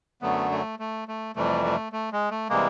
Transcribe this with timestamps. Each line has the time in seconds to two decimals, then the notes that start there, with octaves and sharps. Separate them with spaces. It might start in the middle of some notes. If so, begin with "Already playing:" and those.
0.22 F#2 D3 F#3 A3 B3
0.51 A3
0.79 A3
1.08 A3
1.36 F2 C3 E3 G3 A3
1.65 A3
1.92 A3
2.12 G#3
2.31 A3
2.49 C3 E3 G3 G#3 A#3